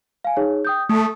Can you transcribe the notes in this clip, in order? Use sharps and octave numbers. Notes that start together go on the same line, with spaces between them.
F5 G#5
D#4 G#4 C#5
G5 D#6 G6
A3 D#6